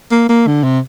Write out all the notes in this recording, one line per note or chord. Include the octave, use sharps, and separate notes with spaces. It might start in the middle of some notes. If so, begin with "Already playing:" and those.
A#3
A#3
D3
C3